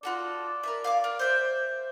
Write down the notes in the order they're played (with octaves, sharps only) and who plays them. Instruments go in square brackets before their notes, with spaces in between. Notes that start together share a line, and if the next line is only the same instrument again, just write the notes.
[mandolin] F4 F#4 A4 [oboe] D5
[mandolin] A#4 B4 E5
F5 G#5 D6
A#4
C5 E5 G5